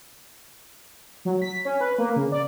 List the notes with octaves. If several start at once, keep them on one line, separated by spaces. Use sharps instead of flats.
F#3
B6
C#4
B4
A#3
C#3
D5